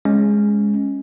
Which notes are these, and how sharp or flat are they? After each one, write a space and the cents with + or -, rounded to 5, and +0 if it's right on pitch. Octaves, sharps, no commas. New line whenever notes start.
G#3 +0 C#4 +0